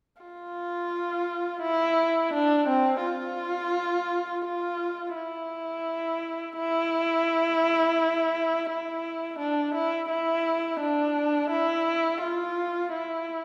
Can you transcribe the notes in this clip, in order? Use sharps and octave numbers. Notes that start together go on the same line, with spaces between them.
F4
E4
D4
C4
F4
F4
E4
E4
E4
D4
E4
E4
D4
E4
F4
E4